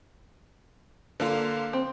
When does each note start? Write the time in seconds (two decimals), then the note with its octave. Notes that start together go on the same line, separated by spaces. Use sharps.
1.20 D3 A#3 F4 B4 F5
1.73 C4